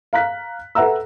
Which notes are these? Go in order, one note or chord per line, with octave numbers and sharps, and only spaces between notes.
F5 A#5 F#6 B6
A4 B4 E5 F#5 A#5 E6